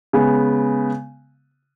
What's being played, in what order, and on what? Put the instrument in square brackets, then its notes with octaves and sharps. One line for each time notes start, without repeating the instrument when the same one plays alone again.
[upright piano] C#3 G#3 B3